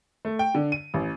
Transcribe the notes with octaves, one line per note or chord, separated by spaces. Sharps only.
A3
G5
D3
D#7
A1